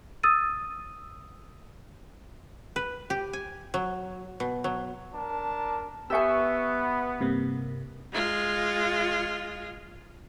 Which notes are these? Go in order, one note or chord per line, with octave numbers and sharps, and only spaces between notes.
D#6 E6 A6 D#7
B4
G4
G#5
F#3
B2
F#3
D4 A#4 A5
B3 G4 E5 G#5 C#6 E6
G2 C3 A#3
G#3 F4